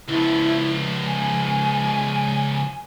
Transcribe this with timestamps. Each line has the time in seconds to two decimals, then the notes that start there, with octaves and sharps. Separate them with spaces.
0.08 C#2 F3 E4
1.07 G#5